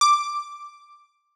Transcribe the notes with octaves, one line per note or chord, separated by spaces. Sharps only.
D6